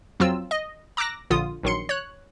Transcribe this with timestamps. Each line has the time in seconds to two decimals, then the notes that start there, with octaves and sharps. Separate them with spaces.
0.20 F2 F#3 C4 F4 E6
0.51 D#5
0.97 A#5 D6 E6 F#6 A#6
1.30 A#1 D3 F4 D#6
1.63 A#1 D#3 F#3 C6 C#7
1.89 C#5 F#6